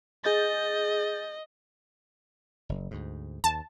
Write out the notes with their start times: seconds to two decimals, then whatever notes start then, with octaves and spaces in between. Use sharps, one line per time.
0.24 G#4 D#5 G6 A6
2.69 F#1
2.91 D2 G#2
3.44 D#2 A5